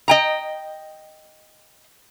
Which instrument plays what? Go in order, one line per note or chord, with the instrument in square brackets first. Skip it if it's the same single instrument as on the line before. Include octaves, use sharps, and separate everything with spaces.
[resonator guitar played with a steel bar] D#5 G5 A#5